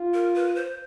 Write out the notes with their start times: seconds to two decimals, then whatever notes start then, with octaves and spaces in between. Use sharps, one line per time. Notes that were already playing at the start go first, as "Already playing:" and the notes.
Already playing: F4
0.14 A#4
0.35 B4
0.55 C5